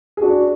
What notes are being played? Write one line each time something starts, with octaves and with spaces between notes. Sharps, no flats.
G#4
D4 F#4